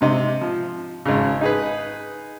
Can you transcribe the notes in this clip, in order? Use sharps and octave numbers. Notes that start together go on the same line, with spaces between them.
G#2 C3 D#5
F3
G#1 C#3
D#4 G#4 B4